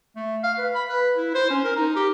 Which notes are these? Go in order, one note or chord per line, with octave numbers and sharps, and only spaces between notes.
A3
F5
B4
B5
B4
E4
C5
C#4
A#4
D#4
G4